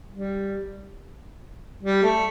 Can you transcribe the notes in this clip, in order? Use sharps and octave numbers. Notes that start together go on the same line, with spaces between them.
G3
G3
A3